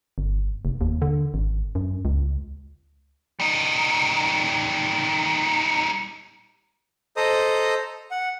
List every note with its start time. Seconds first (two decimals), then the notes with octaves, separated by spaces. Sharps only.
0.18 G1
0.65 F1
0.81 D#2
1.02 D3
1.34 G#1
1.75 F#2
2.05 C#2
3.40 G3 D#4
7.17 A4 C5 D#5 A#5 D#6
8.11 F#5